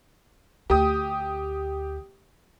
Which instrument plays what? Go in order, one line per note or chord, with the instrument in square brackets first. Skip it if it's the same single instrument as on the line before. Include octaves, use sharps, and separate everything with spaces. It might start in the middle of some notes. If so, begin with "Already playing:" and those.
[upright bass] D2 [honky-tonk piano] G4 D#6